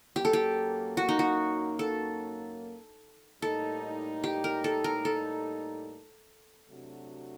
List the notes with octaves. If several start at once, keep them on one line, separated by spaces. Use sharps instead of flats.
F#2 F#3 A#3 G4
A4
G4
F#4
D#4
F#4
A4
A2 G3 A#3 D#4 A4
G4
A#4
A4
A#4
A4
C3 F#3 A3 D4 F#4